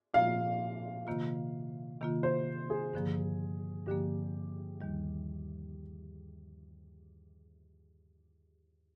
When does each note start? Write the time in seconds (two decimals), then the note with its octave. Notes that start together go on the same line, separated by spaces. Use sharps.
0.14 A#2 F3 A#3 F4 F5
1.07 C3 D#3 A#3 F4
2.01 C3 D#3 A#3 F4
2.23 C5
2.70 G#4
2.93 G2 D3 F3 A#3
3.86 G2 D3 F3 A#3 G4
4.81 D#2 D#3 G3